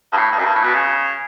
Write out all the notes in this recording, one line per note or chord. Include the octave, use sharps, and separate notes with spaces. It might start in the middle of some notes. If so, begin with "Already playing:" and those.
G2
A2
G2
F#2
G2
A2
B2
C#3